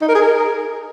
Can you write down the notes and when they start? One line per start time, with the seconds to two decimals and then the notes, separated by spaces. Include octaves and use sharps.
0.01 D#4
0.08 A#4
0.15 G#4
0.21 A#4